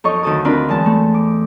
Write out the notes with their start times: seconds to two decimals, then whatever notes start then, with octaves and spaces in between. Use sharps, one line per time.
0.04 F2 D#4 A4 C#5 D#5 C#6
0.23 D2 D#3 A4 A5 D#6
0.45 C4 D4 F4 A#4 B4
0.69 E2 G#3 A5
0.86 A3 A4
1.14 D6